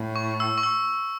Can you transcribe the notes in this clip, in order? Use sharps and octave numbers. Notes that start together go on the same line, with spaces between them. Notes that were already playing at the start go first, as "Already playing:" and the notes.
Already playing: A2
C#6
E6
C#6
E6